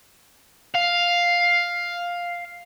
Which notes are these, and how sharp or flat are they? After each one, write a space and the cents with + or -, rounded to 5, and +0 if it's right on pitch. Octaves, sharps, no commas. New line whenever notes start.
F5 +5